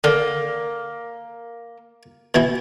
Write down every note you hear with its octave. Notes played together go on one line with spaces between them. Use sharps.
D3 A#3
B2 E3 E4